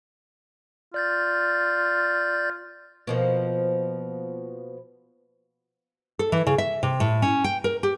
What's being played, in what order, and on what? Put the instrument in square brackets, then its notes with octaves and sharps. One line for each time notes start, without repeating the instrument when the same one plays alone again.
[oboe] F4 [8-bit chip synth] D5 G6 A6
[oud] B2 F3 A#3
[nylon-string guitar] A4
E3
C#3
E5
C3
A2
C#4
G5
A#4
G4